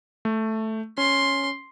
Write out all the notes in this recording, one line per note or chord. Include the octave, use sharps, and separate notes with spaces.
A3
C#4 C6